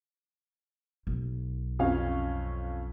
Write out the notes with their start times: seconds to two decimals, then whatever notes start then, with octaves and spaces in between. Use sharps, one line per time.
1.07 B1
1.79 F2 C#4 F5